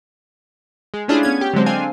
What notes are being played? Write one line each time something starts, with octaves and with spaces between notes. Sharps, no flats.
G#3
A3 C#4 D4 E4 F4 G#4
B3 C#4 G#6
G4
D3 F#3 G#3 C4
C4 D4 C5 F5 G#5